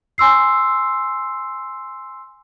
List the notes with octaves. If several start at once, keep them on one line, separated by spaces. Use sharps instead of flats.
G#5 C6 E6 C7